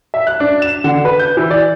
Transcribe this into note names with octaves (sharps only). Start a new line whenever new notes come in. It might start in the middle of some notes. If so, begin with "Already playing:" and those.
E5
F#6
D4
E7
D3
B4
G6
E3
D5